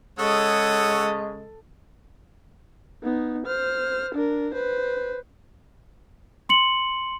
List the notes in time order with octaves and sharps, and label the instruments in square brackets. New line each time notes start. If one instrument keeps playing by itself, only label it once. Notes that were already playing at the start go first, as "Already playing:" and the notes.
[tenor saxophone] C#3 [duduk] G#3 [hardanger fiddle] A4 D#6 [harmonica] C#5 F#5 E6
[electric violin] B3 D#4
C5 F6
D4 A#4
B4 C5
[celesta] C6 C#7 F#7